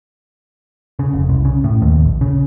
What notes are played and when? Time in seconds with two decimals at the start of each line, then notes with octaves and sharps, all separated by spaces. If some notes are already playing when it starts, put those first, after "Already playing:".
0.99 C#3
1.13 F1
1.29 C2
1.45 C#3
1.64 A2
1.82 D#2
2.05 A#1
2.21 C#3